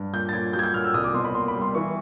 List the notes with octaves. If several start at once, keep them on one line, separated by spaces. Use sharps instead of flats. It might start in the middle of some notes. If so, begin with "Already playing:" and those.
Already playing: G2
A#2 G6
A6
A#2 G#6
F#3 G6
G#6
G6
A#2 F6
E6
C2 D#6
D6
B2 C6
B5
A#3 C6
B5
G3
C6
E3 C#6